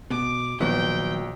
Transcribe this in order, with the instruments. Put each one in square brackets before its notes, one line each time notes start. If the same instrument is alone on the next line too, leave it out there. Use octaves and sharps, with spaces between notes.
[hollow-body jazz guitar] B2 [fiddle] D6
[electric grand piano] A#1 [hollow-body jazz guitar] D#3 F#3 B3 [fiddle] G5